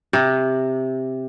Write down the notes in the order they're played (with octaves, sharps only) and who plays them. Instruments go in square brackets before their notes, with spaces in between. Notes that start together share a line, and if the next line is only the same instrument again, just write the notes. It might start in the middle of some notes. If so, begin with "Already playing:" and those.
[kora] C3